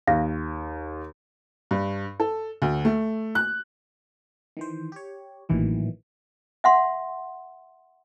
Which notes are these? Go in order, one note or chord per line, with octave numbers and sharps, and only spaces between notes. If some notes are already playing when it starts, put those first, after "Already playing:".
D#2 F5 A#6
G2
A4
D2
A3
F#6
D#3 E3 C5
G4 C#5
A1 A#2 D#3 E3 F#3
E5 F#5 C6